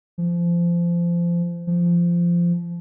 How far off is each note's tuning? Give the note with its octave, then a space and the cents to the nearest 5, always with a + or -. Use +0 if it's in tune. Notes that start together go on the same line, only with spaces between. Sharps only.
F3 -25
F3 -15